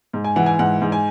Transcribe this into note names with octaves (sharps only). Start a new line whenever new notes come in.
G#2
G#5
E3 F#5
G#5
G#2 F#5
G#2
G#5